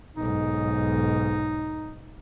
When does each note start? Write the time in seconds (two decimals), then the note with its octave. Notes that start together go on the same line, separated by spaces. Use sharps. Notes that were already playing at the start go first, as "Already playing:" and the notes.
0.16 B1 G#2 D#4